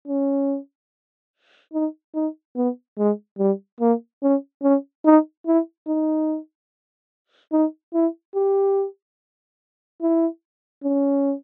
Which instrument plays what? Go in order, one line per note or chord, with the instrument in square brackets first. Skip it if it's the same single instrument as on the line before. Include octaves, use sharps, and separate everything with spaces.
[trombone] C#4
D#4
D#4
B3
G#3
G3
A#3
C#4
C#4
D#4
E4
D#4
D#4
E4
G4
E4
C#4